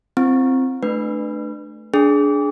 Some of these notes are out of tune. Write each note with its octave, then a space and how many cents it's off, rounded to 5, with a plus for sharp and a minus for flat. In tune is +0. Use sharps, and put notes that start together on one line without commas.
C4 +0 F4 -45
A3 -15 D4 +25 B4 +0
D4 -10 G#4 +15